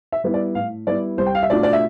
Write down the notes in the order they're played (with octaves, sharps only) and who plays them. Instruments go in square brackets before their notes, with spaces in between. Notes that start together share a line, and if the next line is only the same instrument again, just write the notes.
[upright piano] E5
G3 B3 E4
D5
A2 F5
G3 B3 E4 D5
C2 C5
G5
F5
E5
B2 A3 D4 F4 D5
D5
E5